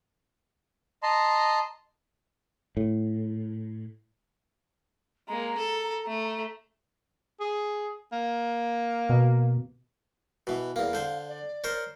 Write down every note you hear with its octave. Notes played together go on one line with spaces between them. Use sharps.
D#5 A5 A#5 C6
A2
G#3 A#3 A#5
A4
A3
G#4
A#3
B2
B2 E3
E2 A#3 F5
D3 C5
D5
A#4 C5 C#5